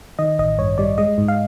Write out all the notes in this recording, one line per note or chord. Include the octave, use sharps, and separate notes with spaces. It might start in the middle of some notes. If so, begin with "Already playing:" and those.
D#3 D#5
A1 D#5
G2 C#5
G3 D5
G#3 D#5
G#2
F5